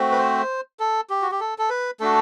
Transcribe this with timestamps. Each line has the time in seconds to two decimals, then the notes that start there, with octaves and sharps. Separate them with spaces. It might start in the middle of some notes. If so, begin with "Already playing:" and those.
Already playing: A3 C4 F#4
0.11 B4
0.18 C5
0.80 A4
1.10 G4
1.22 F#4
1.32 G4
1.40 A4
1.58 A4
1.69 B4
2.00 A3 D4 F#4 A4